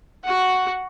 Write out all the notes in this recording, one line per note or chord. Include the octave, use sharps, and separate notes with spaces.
F#4 F#5